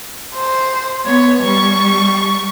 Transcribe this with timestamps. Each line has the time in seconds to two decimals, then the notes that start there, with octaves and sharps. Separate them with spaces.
0.35 C5
1.06 B3 C#5
1.42 G3 C#6